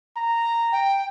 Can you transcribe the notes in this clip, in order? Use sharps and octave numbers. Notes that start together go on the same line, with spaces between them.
A#5
G5